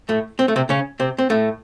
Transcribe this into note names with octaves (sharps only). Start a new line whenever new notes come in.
A2 A3
C4
A3
C3 C4
C#3 C#4
C3 C4
C4
A2 A3